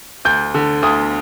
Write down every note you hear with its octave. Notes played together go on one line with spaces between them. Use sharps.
D2 G6
D3
D2 D#6